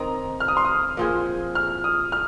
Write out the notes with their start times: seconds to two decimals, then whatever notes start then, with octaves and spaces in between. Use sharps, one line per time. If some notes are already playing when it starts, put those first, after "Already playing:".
Already playing: D#3 C4 D#4 A#5
0.40 F6
0.48 D#6
0.57 C6
0.65 D#6
0.97 A#2 F3 C4 G#4
1.55 F6
1.84 D#6
2.12 F6